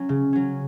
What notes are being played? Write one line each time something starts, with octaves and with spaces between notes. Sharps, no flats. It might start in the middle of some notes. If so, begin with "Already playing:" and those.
Already playing: F#3 C#4
C#3
F#3 C#4